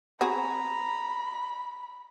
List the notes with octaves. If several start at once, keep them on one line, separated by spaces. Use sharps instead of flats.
C4 F#4 G#4 A#5 B5